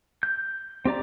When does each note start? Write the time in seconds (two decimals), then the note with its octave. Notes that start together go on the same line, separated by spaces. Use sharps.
0.23 G6
0.85 C4 G4 D5 A#5